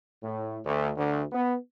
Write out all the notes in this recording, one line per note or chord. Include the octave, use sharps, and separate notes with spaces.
A2
D2
D2
B3